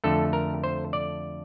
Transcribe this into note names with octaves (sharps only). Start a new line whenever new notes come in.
F2 D3 A3 A4
A#4
C5
D5